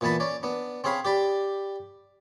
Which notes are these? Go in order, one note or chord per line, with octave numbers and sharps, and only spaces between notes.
A#2 E3 B3 A5 B5
C#4 D5
B3 D4
C4 C#4 G#4 F5 B5
G4 D5 B5